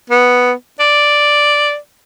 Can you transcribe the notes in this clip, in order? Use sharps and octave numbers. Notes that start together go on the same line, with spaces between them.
B3
D5